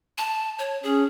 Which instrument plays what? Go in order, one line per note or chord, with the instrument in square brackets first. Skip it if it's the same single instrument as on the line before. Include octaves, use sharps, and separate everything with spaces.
[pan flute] A5
C#5
[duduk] C#4 [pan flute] G#4